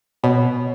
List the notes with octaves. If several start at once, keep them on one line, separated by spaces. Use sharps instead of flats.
B2 C#5